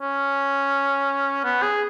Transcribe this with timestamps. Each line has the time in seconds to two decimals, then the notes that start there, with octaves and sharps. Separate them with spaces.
0.01 C#4
1.44 B3
1.62 G#4